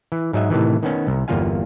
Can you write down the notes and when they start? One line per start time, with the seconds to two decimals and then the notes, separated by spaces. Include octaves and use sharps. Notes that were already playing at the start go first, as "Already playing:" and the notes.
0.12 E3
0.33 G#2 F#3 D#5 E5
0.50 A2 C3 D#3 E3
0.83 D#3 B3 C#4
1.07 C2
1.28 G1 E2 A#3 F4 F5 G#5